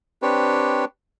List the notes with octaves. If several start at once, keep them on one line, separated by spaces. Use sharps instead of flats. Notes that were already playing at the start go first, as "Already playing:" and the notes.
C4 D4 G4 B4 C#5